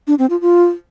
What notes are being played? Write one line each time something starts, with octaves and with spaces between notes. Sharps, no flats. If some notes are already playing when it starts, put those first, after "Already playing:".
D4
C4
F4
F4